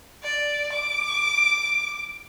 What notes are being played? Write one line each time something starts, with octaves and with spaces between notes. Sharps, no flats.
D5
D6